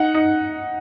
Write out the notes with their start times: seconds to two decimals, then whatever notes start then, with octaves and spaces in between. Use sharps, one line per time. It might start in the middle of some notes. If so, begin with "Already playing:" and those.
Already playing: D#4 F#5
0.15 D#4